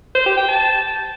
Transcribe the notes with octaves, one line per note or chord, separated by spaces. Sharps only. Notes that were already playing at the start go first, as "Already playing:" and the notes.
C5
G4
G5
A5